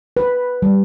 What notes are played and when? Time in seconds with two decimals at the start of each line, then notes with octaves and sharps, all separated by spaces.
0.17 B4
0.62 G3